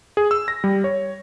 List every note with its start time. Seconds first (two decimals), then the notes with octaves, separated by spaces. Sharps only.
0.17 G#4
0.31 E6
0.48 A#6
0.64 G3
0.84 C#5